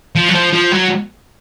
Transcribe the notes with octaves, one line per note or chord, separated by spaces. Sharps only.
F3
F#3
F3
F3
F#3